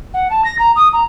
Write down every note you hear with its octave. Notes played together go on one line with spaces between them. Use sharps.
F#5
A5
A#6
A#5
D#6
A#5